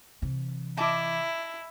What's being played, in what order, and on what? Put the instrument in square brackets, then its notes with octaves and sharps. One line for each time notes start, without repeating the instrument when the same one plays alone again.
[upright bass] C3 E3
[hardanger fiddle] E4 [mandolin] D#5 A5 D6